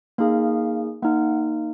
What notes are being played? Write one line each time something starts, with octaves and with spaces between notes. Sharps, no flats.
A#3 D#4 G#4 F5
A#3 D#4 F#5